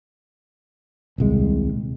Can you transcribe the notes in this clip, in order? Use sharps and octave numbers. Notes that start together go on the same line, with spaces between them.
D#1 C2 G#3